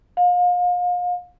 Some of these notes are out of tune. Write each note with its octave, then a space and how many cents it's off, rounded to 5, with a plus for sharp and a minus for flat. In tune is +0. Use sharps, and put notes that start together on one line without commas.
F5 +35